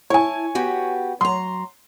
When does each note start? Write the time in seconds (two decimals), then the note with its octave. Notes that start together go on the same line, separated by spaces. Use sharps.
0.10 E4 C#5 G#5 A5
0.55 B3 F#4 G4
1.21 F#3 A#5 C6